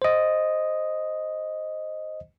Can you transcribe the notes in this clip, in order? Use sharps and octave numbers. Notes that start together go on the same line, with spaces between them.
C5 D#5